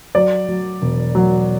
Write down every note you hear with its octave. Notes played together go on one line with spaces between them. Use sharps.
F#3 D5
F#3
E1
F#3